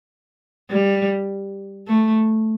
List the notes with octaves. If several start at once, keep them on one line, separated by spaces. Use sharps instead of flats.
G3
A3